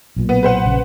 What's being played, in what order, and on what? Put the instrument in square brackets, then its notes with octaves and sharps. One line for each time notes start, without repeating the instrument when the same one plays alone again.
[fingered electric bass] B1 A#2
[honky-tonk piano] B3
B4 C5 F#5
[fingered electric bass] A#1 C#3